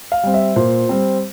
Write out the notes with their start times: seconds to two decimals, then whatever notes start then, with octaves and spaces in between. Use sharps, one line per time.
0.12 F5
0.23 G3 C4
0.34 E5
0.56 A#2 C5
0.89 G3 C4